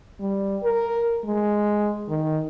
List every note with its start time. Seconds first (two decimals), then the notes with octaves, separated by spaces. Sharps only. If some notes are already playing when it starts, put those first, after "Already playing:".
0.20 G3
0.63 A#4
1.25 G#3
2.09 D#3